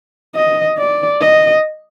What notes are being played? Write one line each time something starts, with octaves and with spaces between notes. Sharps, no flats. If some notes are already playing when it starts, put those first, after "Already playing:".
D#5
D5
D#5